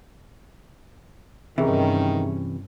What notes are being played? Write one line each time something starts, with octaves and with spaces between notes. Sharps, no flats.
G2 C3 D#3 E3 C#4 G#4 E5